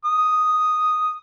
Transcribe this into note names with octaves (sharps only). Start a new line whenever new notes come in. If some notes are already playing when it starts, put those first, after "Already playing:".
D#6